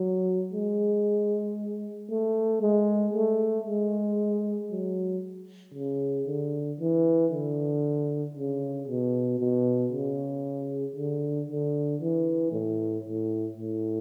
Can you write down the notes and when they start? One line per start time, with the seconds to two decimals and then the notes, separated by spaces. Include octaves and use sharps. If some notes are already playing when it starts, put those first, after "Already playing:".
Already playing: F#3
0.53 G#3
2.10 A3
2.62 G#3
3.13 A3
3.66 G#3
4.71 F#3
5.74 C#3
6.26 D3
6.80 E3
7.32 D3
8.36 C#3
8.88 B2
9.39 B2
9.92 C#3
10.96 D3
11.49 D3
12.01 E3
12.52 A2
13.04 A2
13.57 A2